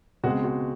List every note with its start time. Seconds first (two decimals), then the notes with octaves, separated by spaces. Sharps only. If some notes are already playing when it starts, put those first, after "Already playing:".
0.24 C#2 B2 G#3 C4 F#4
0.44 F#4